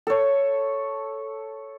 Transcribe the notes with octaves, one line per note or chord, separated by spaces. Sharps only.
A4 C#5